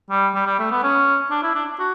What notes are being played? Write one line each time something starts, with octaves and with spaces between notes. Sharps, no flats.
G3
G3
G3
A3
B3
C#4
D4
E4
D4
F#4